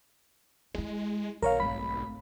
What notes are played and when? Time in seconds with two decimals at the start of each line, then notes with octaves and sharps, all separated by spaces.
0.75 G#3 E4 F4
1.42 B1 D#3 A#4 C#5 F5
1.60 G#1 A3 B5